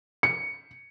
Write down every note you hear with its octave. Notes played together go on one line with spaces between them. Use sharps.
C#7